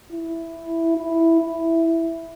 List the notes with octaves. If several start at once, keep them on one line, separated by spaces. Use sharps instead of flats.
E4
E4
E4